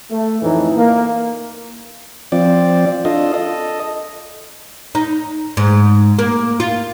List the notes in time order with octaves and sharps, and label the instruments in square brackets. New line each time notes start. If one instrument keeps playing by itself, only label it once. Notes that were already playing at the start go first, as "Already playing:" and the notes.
[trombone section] A3
F2 A2 E3 D#4
A#3
[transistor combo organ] F3 C4 D5
D4 F4 A4 D#5
A4 D#5
[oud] D#4
G#2
A#3
F4